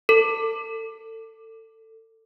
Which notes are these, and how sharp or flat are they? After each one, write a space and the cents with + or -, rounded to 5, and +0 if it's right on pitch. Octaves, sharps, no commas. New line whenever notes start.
A4 +25